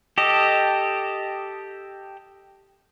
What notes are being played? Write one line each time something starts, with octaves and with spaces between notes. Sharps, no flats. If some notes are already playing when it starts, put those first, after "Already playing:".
G4 A4 D#5